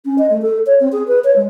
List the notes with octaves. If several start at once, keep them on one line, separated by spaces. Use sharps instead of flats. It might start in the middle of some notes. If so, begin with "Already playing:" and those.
C#4
D#5
A3
A4
C#5
C4
G#4
B4
C#5
G#3